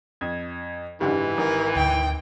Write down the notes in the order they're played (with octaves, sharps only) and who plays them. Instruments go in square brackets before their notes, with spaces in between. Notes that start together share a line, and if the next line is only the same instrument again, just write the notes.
[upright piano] F2 [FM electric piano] G#6
[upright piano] F#1 G#2 D3 [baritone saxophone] E3 [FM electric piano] G4
[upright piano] G#1 [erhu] A#4
[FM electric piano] D2 [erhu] G5